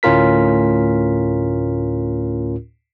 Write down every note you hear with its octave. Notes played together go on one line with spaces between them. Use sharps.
D2 A2 C#4 F4 A#4 B6